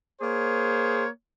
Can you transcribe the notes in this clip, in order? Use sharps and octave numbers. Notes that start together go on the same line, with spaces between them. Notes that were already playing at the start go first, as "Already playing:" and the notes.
A#3 G#4 C5 C#5